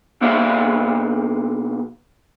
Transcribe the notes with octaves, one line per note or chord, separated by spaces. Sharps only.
B1 A#3 C5 D5 E5 F5